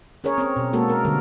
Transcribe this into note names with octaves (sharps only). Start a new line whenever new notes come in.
C#4 G#4 A#4 C#5
C4 C#5
B2
G#3 A#3 F#4 A4
B3 A#4
D3 G3 A#4